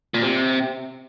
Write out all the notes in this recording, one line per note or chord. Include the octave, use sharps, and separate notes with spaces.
A#2
C3